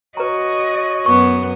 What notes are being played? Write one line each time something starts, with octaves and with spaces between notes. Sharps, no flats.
F#4 B4 C#5 D#5 A#5
F#2 B3 C#6